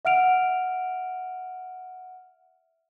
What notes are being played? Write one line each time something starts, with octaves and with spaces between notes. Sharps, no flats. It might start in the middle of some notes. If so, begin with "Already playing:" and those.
E5 F#5 F6 D7 F7